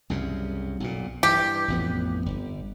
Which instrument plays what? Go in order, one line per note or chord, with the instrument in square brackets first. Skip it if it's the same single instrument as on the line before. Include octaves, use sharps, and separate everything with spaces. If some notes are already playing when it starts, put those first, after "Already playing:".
[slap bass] C2 F#2 C#3
B1 A#2
[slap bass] G2 E3 [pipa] G4
[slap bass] A1 F2 B3
G1